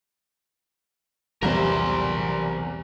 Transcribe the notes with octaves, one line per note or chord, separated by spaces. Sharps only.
B1 E2 C3 G3 A#4 C5